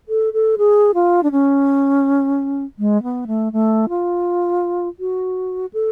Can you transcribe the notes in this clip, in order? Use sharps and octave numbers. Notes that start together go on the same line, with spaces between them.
A4
A4
G#4
F4
D4
C#4
G#3
B3
A3
A3
F4
F#4
A4